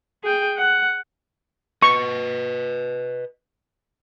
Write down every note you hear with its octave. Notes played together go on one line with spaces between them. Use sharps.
G#4 G5
F#5
B4 D#5 C#6